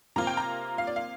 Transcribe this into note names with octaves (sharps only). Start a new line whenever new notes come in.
C3 A#3 F4 A#5
G5
A#5
F5
D5
F5